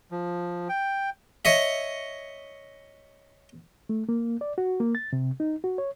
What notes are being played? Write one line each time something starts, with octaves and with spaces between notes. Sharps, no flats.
F3
G5
C#5 D#5 E5
A3
A#3
D5
F#4
A#3
A6
C3
D#4
F#4
C#5